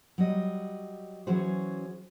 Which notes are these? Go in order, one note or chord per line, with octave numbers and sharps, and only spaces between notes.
F#3 G3 D#5
E3 F#3 C#4 F#4 G#4 C5